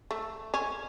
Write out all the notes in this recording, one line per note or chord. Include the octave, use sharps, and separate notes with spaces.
A3
C#4